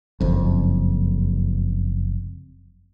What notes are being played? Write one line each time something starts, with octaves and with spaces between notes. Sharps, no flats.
F#1 F2